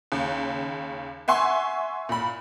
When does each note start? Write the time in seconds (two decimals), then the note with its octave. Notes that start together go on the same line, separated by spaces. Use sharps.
0.12 D#2 C#3
1.28 E5 F#5 G#5 C6 C#6
2.09 A#2 B5